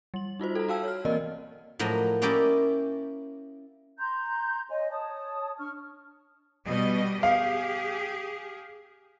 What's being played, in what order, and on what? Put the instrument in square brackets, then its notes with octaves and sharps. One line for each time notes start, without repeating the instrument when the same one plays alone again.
[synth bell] G3 F#7
D#4 F4 F#4 C5
A4 A#5
F#4 A4 F5 G5 A5 E6
C#5 F6
E3 A#3 C4 A#4 D5 D#5
[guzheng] A2 F3 F#3 A#3 D#5
A#3 C#4 E4 G4 D5 D#5
[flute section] A#5 C6 G6
C#5 D#5 G#5
C#5 A5 D#6
D4 C#6 F6
[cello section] B2 G3 D#5
[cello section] G4 G#4 [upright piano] F5